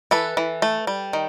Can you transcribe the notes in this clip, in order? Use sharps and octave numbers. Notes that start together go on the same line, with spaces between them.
E3 A4 B4
E3
A3
G3
D#3